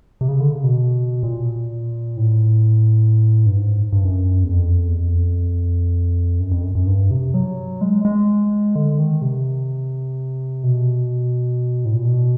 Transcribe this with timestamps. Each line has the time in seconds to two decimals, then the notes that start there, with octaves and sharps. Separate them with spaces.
0.21 C3
0.29 C#3
0.40 D3
0.53 C#3
0.64 B2
1.23 A#2
2.17 A2
3.46 G2
3.57 G#2
3.93 G2
4.05 F#2
4.44 E2
4.51 F2
4.88 E2
4.99 F2
6.40 F#2
6.52 F2
6.63 F#2
6.75 F#2
6.87 G2
7.11 C3
7.34 F#3
7.81 G#3
8.05 G#3
8.75 D3
8.99 D#3
9.22 C3
10.64 B2
11.85 A2
11.94 A#2
12.05 B2